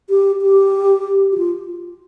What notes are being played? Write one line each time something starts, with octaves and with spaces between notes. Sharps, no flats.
G4
G4
F#4
F4